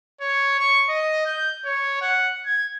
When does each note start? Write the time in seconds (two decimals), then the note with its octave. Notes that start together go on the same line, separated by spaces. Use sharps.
0.21 C#5
0.59 C#6
0.89 D#5
1.26 G6
1.65 C#5
2.01 F#5
2.46 G#6